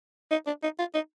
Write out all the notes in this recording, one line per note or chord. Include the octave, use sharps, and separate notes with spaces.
D#4
D4
D#4
F4
D#4